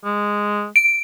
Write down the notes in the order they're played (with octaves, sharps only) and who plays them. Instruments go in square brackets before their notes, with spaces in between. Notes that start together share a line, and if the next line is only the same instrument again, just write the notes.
[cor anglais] G#3
[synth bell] D7